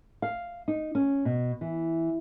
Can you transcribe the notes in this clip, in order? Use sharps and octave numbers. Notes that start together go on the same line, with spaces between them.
F5
D#4
C#4
B2
E3